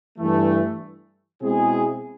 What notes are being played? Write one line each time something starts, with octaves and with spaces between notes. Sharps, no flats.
G2 E3 A3
B2 G#3 C4 E4 G#4